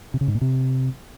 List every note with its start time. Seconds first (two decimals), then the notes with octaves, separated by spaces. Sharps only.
0.14 C3
0.21 C#3
0.28 G#2
0.35 A#2
0.41 C3